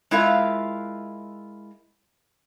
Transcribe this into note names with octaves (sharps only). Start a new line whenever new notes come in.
G#3 E4 F4 A#4 E5 F5